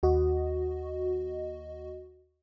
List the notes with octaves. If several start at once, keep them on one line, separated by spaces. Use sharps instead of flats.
D#2 F#4 D#5